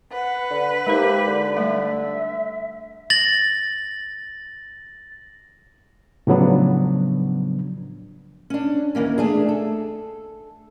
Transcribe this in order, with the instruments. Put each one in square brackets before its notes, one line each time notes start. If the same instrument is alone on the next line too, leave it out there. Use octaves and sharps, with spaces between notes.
[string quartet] B4 [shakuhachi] F#5
[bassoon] D3
[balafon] G#3 D#4 C5 [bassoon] A#3 [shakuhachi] G4
[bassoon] D3
[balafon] G3 A3 [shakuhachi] E5
[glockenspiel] A6 A#6 F#7
[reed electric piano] A2 C#3 F3 F#3 B3 D4
[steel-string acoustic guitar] C#4 D4
D#2 E3 A#3 C#4
A3 D4 G#4
A4